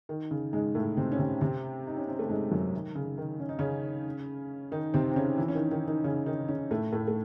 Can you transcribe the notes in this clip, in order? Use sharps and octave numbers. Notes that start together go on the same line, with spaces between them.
D#3
C#3
G#2 G#3
A2 A3
C3 C4
C#4
C3 C4
C3 C4
D#4
C#4
C4
A3
G#2 G#3
F#2 F#3
D#3
C#3
D#3
C#4
D#4
C#3 C#4
D#3 D#4
C3 C4
C4
C#3 C#4
E3 E4
C#4
D#3 D#4
D#3 D#4
D#3 D#4
C#3 C#4
D#3 D#4
C#3 C#4
A2 A3
A2 A3
A3